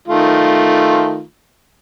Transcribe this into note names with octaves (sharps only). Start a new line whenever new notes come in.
D#3 A3 F4